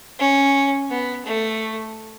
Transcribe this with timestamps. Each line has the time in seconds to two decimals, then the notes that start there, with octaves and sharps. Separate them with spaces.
0.19 C#4
0.90 B3
1.25 A3